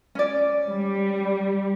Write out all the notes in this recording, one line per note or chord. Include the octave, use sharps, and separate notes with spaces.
C#4 D5
G3